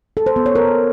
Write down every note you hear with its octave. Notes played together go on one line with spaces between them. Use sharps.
A4
C5
B3
C#5
A#4